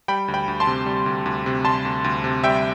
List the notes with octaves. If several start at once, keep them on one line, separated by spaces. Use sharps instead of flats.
G3 G5 B5
D2
G5 B5
D2
A5 C6
C3
G3
D2
D2
C3
G3 A5 C6
D2
D2
C3
G3 E5 G5